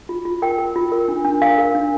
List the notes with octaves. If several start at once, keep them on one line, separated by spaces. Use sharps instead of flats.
F4
F4
A#4 G5
A#4
F4
A#4
D4
D4
A#4 F5
A#4
D4